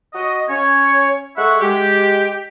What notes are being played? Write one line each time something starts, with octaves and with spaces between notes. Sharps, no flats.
F#4 D#5
C#4 C#5
G#3 A4 E5 F#5 C#6
G#3 G4